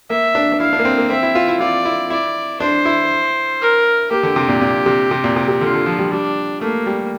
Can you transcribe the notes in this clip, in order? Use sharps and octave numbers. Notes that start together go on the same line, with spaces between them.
A#3 E5
D4
D4
E4 F5
D4
A#3
C4
A#3
C4 E5
E4
F4
E4
F4 D5
E4
E4 D5
D4 C5
E4
A#4
A#3 G4
D3
C3
A#2
A#2
C3
C3
A#2
C3
C3
D3 F4
D3
F3
G3
G3 D4
A3 A#3
G3